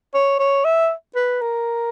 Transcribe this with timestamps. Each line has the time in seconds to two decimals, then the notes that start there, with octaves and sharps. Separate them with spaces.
0.14 C#5
0.39 C#5
0.65 E5
1.16 B4
1.41 A#4